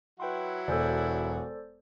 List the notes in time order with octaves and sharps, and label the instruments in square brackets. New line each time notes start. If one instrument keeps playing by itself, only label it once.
[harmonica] F#3 E4 F#4 [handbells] B4 G5 C6
[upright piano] E1 [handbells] A4 C5 D5